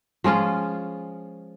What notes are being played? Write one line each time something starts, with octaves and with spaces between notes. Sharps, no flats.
F3 G#3 C#4 F4